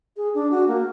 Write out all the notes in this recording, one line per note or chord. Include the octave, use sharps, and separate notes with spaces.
G#4
D4
F#4
A#3